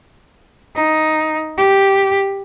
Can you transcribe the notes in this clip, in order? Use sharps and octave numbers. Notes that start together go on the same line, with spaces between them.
D#4
G4